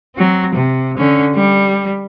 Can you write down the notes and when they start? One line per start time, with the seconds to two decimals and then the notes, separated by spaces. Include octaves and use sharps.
0.15 F#3 C4
0.55 C3
0.98 D3 C#4
1.35 G3